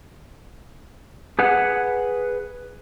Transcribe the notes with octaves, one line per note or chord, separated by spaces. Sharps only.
G#4 B4 F#5